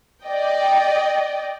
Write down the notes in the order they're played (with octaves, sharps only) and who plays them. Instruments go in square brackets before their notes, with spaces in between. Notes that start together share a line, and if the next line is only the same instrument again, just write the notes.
[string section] D5 D#5 G5